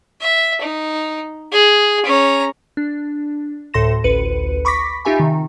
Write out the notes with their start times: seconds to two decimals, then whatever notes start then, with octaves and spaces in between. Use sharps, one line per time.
0.21 E5
0.61 D#4
1.52 G#4
2.05 C#4 A#5
2.77 D4
3.74 D2 A2 A4 C6 A#6 E7
4.04 A1 D2 B4 C#7 D#7
4.65 B5 C#6 D6 A#6 B6
5.05 D#4 F4 G4 E5 G#5 B5
5.20 C3 D#3